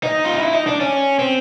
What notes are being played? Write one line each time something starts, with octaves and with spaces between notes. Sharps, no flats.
D#4
F4
E4
D#4
D4
C#4
C4